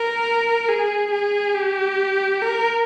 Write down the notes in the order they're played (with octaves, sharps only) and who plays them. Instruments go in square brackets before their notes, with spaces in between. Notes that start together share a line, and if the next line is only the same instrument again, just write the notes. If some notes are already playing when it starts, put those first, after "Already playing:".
Already playing: [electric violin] A#4
G#4
G#4
G4
A#4